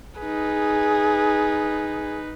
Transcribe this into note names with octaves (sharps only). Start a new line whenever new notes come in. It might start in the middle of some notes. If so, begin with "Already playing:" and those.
D#4 G#4 B4